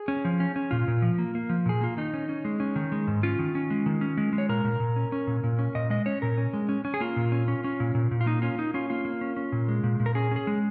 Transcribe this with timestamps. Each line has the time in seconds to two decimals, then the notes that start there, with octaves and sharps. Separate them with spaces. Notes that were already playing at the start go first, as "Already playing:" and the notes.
Already playing: G#4
0.08 C#4
0.25 F3
0.40 C#4
0.56 C#4
0.71 A#2 F4
0.88 A#2
1.02 F3
1.18 A#3
1.35 A#3
1.49 F3
1.66 A#2 G#4
1.81 A#3 F4
1.97 D#3 D#4
2.14 C#4
2.29 C#4
2.45 G#3
2.60 C#4
2.76 D#3
2.92 G#3
3.07 G#2
3.23 C#4 F4
3.39 D#3
3.55 C#4
3.70 G#3
3.86 D#3
4.01 C#4
4.17 G#3
4.33 G#3
4.38 C#5
4.49 A#2 A#4
4.65 A#2
4.80 A#2
4.96 C#4
5.12 C#4
5.27 A#2
5.44 A#2
5.59 C#4
5.75 A#2 D#5
5.90 G#3 D#5
6.06 C#4 C#5
6.22 A#2 A#4
6.38 C#4
6.53 G#3
6.69 C#4
6.85 C#4
6.94 G#4
7.00 A#3 F4
7.16 A#2
7.32 C#4
7.48 C#4
7.64 C#4
7.80 A#2
7.95 A#2
8.11 A#2
8.21 F4
8.26 A#3 D#4
8.42 C#4 F4
8.58 A#3 D#4
8.74 C#4 F4
8.90 A#3 F4
9.05 A#3
9.21 C#4
9.37 C#4
9.52 A#2
9.69 G#3
9.84 A#2
10.00 A#2
10.06 A#4
10.15 C#4 G#4
10.31 C#4 G#4
10.47 G#3